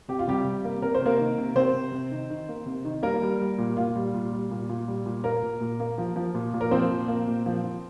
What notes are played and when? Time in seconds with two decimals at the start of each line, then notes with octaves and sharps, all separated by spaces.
0.08 C3 G4
0.19 F4
0.27 C3 G3 G4
0.45 C3
0.64 A#3
0.82 C3 A#4
0.95 C5
1.01 C3 A#3 A#4
1.19 D#3
1.38 C3
1.55 C3 C4 C5
1.74 C3
1.92 C3
2.11 D#3
2.30 D#3
2.49 A#3
2.66 C3
2.85 D#3
3.03 G3 A#3 A#4
3.22 G3
3.40 G3
3.58 A#2
3.77 A#2 F4
3.96 G3
4.14 A#2
4.32 G3
4.51 A#2
4.69 A#2
4.88 G3
5.06 A#2
5.24 A#3 A#4
5.43 A#2
5.61 A#2
5.80 A#3
5.98 F3
6.16 F3
6.34 A#2
6.54 A#2
6.61 A#4
6.71 F3 C4 C5
6.90 A#2
7.08 A#3
7.28 A#2
7.46 F3
7.64 F3